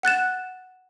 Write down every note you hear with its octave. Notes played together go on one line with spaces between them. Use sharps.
F#5 F#6 A6 E7